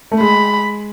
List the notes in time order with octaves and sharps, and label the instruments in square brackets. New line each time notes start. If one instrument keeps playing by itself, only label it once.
[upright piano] A3
[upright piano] G#3 [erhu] B5